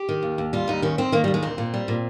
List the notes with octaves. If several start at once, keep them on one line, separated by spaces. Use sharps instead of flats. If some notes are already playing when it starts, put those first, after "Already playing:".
Already playing: G4
D#3
D#2
D#2
G3 F4
D#2 D#4
D#3 C#4
D#3 C4
D#3 A#3
D#2 G3
G#3
A#2 C4
A#2
G3
A#2